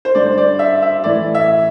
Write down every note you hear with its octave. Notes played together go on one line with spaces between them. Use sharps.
C5
G2 D3 D5
C5
D5
E5
E5
A2 E3 D5
E5